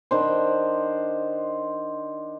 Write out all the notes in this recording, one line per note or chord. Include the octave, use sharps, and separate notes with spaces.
D#3 D4 C5